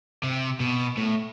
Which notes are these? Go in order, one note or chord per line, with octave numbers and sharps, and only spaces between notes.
C3
B2
A2